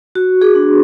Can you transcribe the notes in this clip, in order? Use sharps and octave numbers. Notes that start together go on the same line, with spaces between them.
F#4
G#4
D4